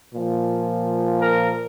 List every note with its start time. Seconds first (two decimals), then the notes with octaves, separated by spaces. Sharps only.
0.14 A#2 F3
1.20 A#4